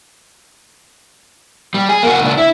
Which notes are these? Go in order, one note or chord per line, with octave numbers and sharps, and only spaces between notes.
G3
G#4
A#3 F#4
C#2 D4
E4